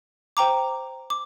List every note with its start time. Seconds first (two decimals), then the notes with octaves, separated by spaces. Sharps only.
0.37 C5 G5 A#5 D6
1.10 D6